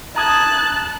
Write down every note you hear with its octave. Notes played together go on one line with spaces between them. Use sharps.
A5 A#5 D#6 F#6 G#6